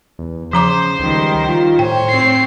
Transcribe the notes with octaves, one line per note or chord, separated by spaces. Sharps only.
E2
C#3 F3 C5 A#5 D6
C#2 D#3 G3
F4
A2 C5 C#5 G5
C4 C7